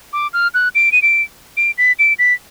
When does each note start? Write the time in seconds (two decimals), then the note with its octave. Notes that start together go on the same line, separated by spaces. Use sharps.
0.13 D6
0.33 F6
0.54 F#6
0.75 D7
0.92 D#7
1.02 D7
1.57 D7
1.78 B6
1.99 D7
2.19 B6